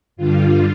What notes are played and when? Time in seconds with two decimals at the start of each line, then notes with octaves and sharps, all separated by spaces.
0.16 G2 D3 G3 F4